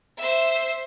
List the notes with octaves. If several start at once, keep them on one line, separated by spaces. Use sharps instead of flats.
C5 E5